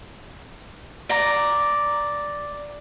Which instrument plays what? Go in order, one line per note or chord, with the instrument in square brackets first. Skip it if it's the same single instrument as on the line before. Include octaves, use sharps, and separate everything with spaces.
[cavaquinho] D5 A#5